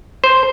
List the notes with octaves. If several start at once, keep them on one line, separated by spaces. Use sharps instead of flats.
C5